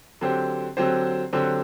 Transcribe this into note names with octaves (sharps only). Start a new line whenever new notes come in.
D3 F#3 C4 G4 C5
D3 F#3 C4 G4 C5
D3 F#3 C4 G4 C5